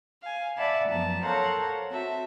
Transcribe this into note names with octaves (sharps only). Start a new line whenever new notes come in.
F5 G#5
D5 E5 F#5 A5 B5
F#2 F3 B3 A5 A#5
A4 A#4 C5 C#5 F5 F#5
C4 F#4 E5 A5